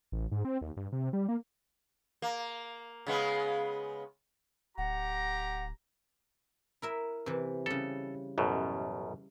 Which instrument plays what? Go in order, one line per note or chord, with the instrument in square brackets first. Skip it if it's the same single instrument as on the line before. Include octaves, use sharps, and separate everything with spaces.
[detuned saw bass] A1
G#2
C4
D#2
G2
C3
G3
A#3
[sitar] A#3
C#3 G#3 B3
[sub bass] D1 [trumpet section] G4 A#5 [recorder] F#5
[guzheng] E4 A#4 E5
C3 E3
[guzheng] C#3 G3 [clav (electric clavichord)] A4
[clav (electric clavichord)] A1 F#2 B2